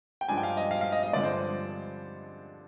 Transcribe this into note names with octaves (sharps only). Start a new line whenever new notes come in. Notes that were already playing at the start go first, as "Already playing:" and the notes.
G5
G2 F3 G#3 D4 G#5
G5
F5
D#5
F5
F5
D#5
D#5
G2 D3 F3 G#3 C4 D5
C5